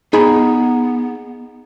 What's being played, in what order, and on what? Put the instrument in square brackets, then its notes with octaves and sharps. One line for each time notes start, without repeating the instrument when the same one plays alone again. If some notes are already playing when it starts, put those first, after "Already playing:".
[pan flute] B3 [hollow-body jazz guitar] D#4 G#4 B5